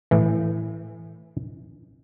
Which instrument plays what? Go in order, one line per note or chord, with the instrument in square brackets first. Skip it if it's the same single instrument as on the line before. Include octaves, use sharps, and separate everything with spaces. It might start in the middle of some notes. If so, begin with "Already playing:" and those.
[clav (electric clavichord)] A2 E3